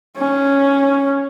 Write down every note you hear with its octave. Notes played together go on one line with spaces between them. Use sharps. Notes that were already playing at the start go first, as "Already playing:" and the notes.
C#4